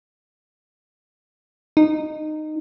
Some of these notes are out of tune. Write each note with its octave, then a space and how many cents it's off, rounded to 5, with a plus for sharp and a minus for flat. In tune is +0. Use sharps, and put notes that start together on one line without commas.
D#4 -15